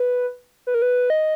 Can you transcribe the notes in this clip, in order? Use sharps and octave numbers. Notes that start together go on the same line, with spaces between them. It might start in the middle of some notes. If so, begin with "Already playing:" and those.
Already playing: B4
B4
A#4
B4
D#5